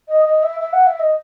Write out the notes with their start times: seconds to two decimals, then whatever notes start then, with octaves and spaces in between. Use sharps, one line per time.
0.08 D#5
0.25 D#5
0.43 E5
0.60 E5
0.73 F#5
0.87 E5
0.99 D#5